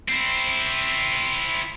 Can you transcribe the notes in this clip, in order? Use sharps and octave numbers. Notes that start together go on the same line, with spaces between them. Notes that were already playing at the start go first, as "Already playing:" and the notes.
C4 E4